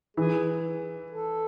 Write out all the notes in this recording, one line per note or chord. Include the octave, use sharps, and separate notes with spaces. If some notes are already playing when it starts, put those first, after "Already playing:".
E3 G#4
A4